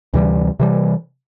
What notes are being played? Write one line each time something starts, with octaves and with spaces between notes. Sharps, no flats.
D2 C3 E3 G3
C3 E3 G3